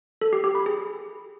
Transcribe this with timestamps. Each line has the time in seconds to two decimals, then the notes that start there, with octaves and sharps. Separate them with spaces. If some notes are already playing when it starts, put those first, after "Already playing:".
0.21 A4
0.33 G4
0.44 G4
0.55 B5
0.66 G#4